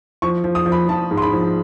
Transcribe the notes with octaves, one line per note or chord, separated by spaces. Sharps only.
F3 C#6
F3
D#6
F3
B5
F3 A5
G#2
C6
B5
F3